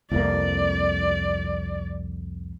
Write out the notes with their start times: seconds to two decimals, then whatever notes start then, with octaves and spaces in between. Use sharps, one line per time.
0.11 C2 F2 A#3 D5